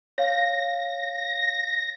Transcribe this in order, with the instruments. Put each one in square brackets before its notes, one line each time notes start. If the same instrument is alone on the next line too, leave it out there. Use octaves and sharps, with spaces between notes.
[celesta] C#5 F5 [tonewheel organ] A#6